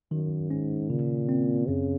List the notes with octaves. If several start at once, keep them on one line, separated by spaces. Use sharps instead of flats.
F#2 D#3
G#2 C#4
A#2 C#3
C4
F#2 C#3